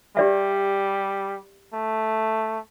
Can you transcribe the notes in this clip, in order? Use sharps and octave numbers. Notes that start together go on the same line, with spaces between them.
G3 G4 D5 E5
A3